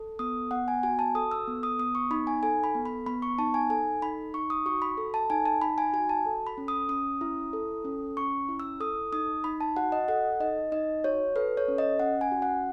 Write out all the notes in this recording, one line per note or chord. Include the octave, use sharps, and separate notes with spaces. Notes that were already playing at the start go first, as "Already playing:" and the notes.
Already playing: A4
B3 D#6
B3 F#5
G#5
F#4 G#5
A5
A4 D#6
E6
B3
D#6
B3 D#6
C#6
D#4 B5
G#5
A4 G#5
B5
B3
B5
B3 B5
C#6
D#4 A5
G#5
A4 G#5
D#4 B5
D#4 C#6
D#6
F#4 C#6
B5
A4
A5
D#4 G#5
A5
D#4 B5
G#5
F#4 G#5
A5
A4
B5
C#4
D#6
C#4 D#6
E4
A4
C#4
C#4 C#6
E4
E6
A4 D#6
D#4 D#6
D#4 B5
A5
F#4 F#5
D#5
A4 F#5
D#4 D#5
D#4 D#5
F#4 C#5
A4 B4
C#5
C#4
D#5
C#4 F#5
G#5
F#4
F#5